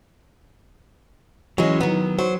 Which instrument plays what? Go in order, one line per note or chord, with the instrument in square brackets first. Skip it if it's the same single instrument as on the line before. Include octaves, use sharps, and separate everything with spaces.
[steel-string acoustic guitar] E3 C#4 [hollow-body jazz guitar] F#3 G#3
[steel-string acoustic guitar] D#3 F#3 [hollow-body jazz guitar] B3
[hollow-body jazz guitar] F#3 [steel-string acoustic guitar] C5